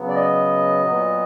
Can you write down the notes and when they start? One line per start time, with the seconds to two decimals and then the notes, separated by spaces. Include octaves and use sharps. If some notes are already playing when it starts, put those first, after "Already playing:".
Already playing: C#3 F#3 B3
0.08 D5
0.15 D#5
0.84 A#2 F#3 B3